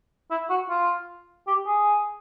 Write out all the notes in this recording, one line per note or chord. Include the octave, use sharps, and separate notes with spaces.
E4
F#4
F4
G4
G#4